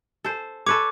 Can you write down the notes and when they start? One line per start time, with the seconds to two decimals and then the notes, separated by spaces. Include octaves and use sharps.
0.24 A4 C5
0.67 A4 B4 C#5 D6